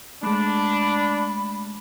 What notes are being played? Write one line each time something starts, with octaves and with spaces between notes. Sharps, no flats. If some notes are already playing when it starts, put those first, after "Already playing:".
G#3 A3 D4 B5